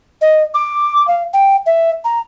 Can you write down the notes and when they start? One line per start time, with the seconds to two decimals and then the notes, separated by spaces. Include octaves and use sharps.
0.22 D#5
0.54 D6
1.08 F5
1.34 G5
1.66 E5
2.05 A#5